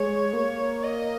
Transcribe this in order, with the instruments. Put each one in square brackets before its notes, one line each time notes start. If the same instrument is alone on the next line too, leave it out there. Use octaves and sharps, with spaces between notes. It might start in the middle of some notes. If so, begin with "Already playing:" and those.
Already playing: [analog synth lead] G#3 [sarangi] C#5
[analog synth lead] A#3
[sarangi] D#5